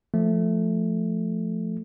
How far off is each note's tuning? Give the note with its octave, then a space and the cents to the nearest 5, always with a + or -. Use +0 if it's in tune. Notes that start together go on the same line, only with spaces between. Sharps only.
F3 +0 A3 +0